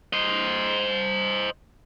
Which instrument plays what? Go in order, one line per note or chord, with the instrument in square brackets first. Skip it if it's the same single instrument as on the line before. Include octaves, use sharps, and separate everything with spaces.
[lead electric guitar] C5 D#5